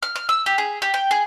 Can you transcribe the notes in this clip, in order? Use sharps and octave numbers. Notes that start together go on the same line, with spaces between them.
F6
F6
E6
G4
G#4
G4
G5
G#4